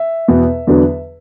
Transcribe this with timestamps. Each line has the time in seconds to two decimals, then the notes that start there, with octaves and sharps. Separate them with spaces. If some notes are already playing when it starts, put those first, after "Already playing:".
Already playing: E5
0.28 E2 B2 B3
0.67 E2 D3 F#3 B3 D4